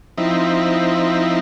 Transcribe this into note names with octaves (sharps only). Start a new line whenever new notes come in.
F3 C4 D#4 E4